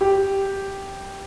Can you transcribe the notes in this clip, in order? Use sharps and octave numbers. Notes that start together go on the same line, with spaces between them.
G4